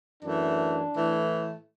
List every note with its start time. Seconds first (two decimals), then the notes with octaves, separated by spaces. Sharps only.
0.23 F#2 E3 A3 D4
0.95 A2 E3 A3